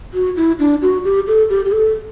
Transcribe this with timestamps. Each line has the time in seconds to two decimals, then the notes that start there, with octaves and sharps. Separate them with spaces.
0.14 F#4
0.36 E4
0.59 D4
0.82 F#4
1.04 G4
1.27 A4
1.50 G4
1.65 G4
1.72 A4